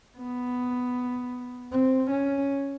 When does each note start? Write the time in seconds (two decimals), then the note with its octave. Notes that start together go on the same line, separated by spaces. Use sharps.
0.18 B3
1.72 C4
2.11 C#4